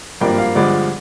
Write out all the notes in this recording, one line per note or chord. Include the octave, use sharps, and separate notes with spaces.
G#1 G2 F3 A#3 D4 G5
F5
G1 G2 D3 F3 G#3 D5